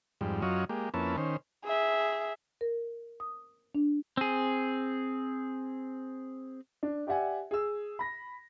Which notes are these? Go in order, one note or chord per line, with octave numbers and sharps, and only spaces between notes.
F2 G#2 G3
F#2 F#3 F4 C#5 D#5
G#3 A#3 G4
F2 A#3 C#4 E4 B4 A5
D#3 C#4 C5
G#4 E5
A#4
D#6
D4
C4 G#4
D4
G4 D5 E5 F#5 G#5
G#4 E6
B5 A#6